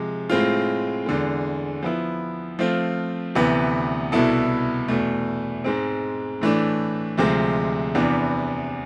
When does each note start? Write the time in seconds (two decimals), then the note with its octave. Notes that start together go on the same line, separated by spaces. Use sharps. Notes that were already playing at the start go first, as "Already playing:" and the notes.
Already playing: C3 F3 G#3
0.30 A2 G#3 C4 F4
1.06 E2 D3 G#3
1.82 F3 B3 E4
2.59 F3 A3 C4 F4
3.35 D2 C3 E3 B3
4.12 C2 B2 B3 E4 A4
4.88 E2 B2 A3
5.64 G#2 G#3 C4
6.41 A2 E3 A3 D4
7.18 D2 C3 F3 G#3
7.95 E2 C3 E3 B3 D4